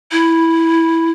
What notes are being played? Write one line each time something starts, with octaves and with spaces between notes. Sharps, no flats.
E4